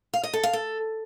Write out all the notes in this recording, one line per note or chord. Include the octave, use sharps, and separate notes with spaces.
F5
D#5
A4
F5
A4